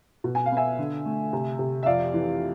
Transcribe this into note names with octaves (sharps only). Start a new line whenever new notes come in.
B2
G#5
F5
B3
E5 G#5
D3
A3
C3
C3
E5
F2 D5 F5
E3